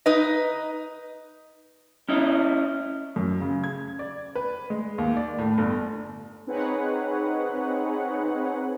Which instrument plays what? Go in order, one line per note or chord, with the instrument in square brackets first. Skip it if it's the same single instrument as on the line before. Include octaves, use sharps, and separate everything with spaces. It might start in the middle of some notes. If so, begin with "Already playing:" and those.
[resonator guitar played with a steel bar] D#4 B4 D#5
[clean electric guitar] C#4 E4 D#5
[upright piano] F#2
C#3
G#6
D5
B4
G#3
D#2
D5
A2
G1
[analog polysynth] C4 D#4 G#4 B4 C#5 F#5